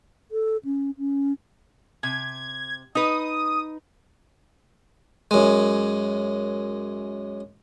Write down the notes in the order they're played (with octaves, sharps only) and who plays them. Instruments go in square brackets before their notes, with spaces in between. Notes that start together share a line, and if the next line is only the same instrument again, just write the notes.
[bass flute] A4
C#4
C#4
[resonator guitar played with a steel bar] C3 [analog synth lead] G#6
[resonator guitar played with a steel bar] D#4 B4 [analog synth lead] D#6
[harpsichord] F#2 G#3